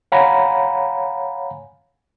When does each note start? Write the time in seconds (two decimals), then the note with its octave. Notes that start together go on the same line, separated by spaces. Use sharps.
0.12 C#5 F5 F#5 G#5 A#5 B5